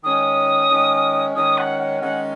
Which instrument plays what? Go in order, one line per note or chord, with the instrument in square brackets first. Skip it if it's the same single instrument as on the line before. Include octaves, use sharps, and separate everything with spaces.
[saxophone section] D#3 G#3 C#4 [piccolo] D#6
[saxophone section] D#3 G#3 C#4
[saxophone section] D#3 G#3 C#4 [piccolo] D#6
[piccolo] F#5
F#5
[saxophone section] D#3 G#3 C#4 [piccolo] F#5